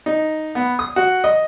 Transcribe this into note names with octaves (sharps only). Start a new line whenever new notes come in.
D#4
B3
D#6
F#4
D#5